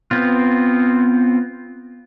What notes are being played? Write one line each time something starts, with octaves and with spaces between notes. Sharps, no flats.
B3 C4 F4